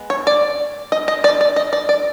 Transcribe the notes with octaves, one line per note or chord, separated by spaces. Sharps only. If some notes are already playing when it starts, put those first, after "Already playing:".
Already playing: G#3 B3
C#5
D5
D#5
D#5
D5
D5
D#5
D5
D5